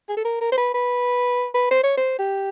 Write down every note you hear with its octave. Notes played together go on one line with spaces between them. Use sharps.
G#4
A4
A#4
A#4
C5
B4
B4
B4
C5
C#5
C5
G4